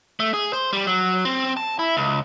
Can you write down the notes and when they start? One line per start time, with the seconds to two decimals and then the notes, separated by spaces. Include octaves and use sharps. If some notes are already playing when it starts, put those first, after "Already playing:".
0.20 A3
0.34 G#4
0.53 C5
0.73 G3
0.87 F#3
1.25 C4
1.57 A5
1.79 E4
1.97 C#2